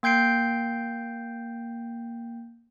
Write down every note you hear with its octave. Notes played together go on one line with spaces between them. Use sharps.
A#3 G5 G6 C7 D7